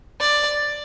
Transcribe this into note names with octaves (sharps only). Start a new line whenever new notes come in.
D5